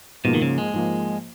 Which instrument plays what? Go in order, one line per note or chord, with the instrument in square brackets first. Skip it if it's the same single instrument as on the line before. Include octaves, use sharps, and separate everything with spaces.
[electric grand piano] G#2 F3 A#3 [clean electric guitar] B2
[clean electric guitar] D#3
C#3
G#3
[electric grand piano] G#2 F3 A#3